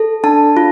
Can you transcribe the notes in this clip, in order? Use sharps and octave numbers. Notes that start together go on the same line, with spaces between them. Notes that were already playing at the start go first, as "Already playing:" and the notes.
Already playing: A4
D4 A5
F4